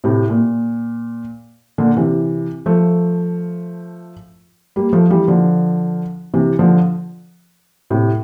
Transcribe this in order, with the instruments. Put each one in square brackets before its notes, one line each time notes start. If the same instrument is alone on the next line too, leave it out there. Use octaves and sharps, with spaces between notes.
[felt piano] A2 C3
A#2
A#2 D3
C3 E3
F3 A3
G3 A#3
F3 A3
E3 G3
D3 F3
C3 E3
D3 F3
A2 C3